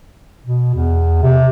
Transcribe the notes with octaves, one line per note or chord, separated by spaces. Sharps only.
B2
E2
C3